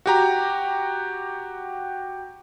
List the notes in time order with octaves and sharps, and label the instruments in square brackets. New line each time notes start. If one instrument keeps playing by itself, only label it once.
[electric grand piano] F#4 G4 A#5